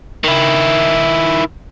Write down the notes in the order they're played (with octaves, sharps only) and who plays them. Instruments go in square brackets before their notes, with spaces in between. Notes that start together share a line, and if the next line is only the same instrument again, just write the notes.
[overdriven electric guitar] D#3 E4